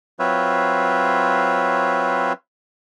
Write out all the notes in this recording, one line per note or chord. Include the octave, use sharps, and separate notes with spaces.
F#3 C4 F4 B4 C#5 E5